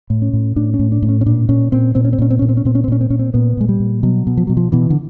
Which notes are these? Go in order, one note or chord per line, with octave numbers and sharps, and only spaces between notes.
A2
C#4
A2
A2 D4
C#4
A2
D4
A2
C#4
C#4
A#2 D4
A#2 C#4
A#2 C4
A#2 C4
C#4
C4
A#2 C#4
C4
A#2 C#4
C4
C#4
A#2 C4
C#4
C4
A#2 C#4
C4
A#2 C#4
C4
A#2 B3
A#2 G#3
G3
A#2
B2 F#3
B2
F3
B2 F#3
F3
B2 E3
D3